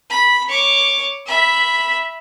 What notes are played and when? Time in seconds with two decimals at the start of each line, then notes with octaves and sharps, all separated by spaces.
0.10 B5
0.48 C#5 D6
1.27 E5 B5